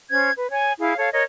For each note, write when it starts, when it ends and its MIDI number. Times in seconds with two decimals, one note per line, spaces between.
0.10 0.31 61
0.10 0.31 72
0.10 0.31 92
0.37 0.50 71
0.51 0.73 73
0.51 0.73 80
0.78 0.96 64
0.78 0.96 68
0.78 0.96 77
0.97 1.10 69
0.97 1.10 73
0.97 1.10 77
1.13 1.23 70
1.13 1.23 73
1.13 1.23 75